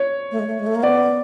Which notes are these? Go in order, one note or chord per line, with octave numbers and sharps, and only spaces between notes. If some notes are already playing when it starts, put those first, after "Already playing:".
Already playing: C#5
A3
G#3
A3
G#3
A3
A#3
B3 D5